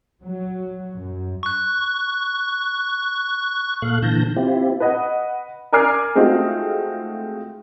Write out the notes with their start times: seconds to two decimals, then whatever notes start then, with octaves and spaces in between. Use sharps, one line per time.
0.22 F#3
0.96 F#2
1.43 C#6 F#6
3.82 A#2 A4 F5 F#6
4.02 A#2 D3 E3 A5 G6 A#6
4.36 C4 E4 F4 G4
4.80 B4 D#5 F#5
5.72 A#4 D5 G#5 D6 F6 C7
6.15 G#3 A3 C4 D#4 F4 F#4